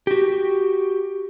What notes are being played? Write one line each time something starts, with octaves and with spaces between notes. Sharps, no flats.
F#4 G4